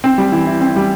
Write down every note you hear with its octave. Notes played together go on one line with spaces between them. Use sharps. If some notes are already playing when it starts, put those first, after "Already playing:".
C4
G3
E3
E4
C4
G3